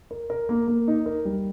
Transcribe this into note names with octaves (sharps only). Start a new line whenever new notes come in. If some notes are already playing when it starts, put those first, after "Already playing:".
A#4
A#4
A#3
A#3
D#4
A#4
G3